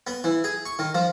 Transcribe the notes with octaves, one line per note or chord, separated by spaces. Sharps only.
B3
E3
G#4
C#6
D#3
F3